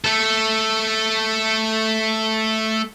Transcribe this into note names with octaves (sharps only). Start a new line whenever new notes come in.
A3 A4